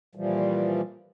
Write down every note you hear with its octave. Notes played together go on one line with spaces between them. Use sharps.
A#2 E3 F3 G3